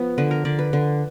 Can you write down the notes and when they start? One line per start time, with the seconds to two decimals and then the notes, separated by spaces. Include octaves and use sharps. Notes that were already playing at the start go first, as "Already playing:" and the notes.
Already playing: F3 B3
0.18 D3 B4
0.31 A#4
0.45 D3 D5
0.59 B4
0.73 D3